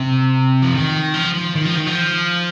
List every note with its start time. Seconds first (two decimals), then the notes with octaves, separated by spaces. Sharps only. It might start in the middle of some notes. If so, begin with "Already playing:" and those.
Already playing: C3
0.63 F3
0.72 D#3
1.14 F3
1.34 F3
1.55 D#3
1.65 F3
1.76 D#3
1.86 F3